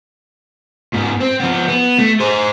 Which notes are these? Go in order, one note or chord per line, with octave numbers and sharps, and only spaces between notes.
G#2 B3
C4
F3 B3
B3
A3
G#4 C5